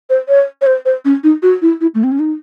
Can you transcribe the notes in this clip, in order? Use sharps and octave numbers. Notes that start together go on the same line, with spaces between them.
C5
C#5
C#5
C5
C5
C#4
D#4
F#4
E4
E4
A3
C4
C#4
D#4